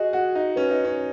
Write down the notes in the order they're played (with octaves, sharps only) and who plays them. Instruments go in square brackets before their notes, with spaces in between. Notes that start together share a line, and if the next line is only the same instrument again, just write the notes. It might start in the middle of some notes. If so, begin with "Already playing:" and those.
Already playing: [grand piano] F#4 G#4 [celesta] D#5
[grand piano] F#4 [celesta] F#5
[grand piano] D#4
[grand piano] C#4 [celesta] B4
[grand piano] D#4
C#4